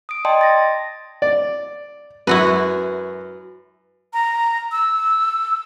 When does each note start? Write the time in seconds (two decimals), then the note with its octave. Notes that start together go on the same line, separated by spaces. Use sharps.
0.09 D#6 D7
0.25 D5 D#5 G5 A5 C6
0.41 A6 A#6
1.22 D5
2.27 F#2 E4 F#4 B4
4.13 A#5
4.72 E6